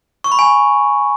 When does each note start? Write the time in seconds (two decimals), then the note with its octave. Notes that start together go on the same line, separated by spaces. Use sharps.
0.24 C#6
0.32 B5
0.39 G#5